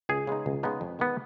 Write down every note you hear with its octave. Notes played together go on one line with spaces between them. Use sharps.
C#2 G#4
C#3 G#3 B3 D#4
C#2
C#3 G#3 B3 D#4
F2
D#3 G#3 B3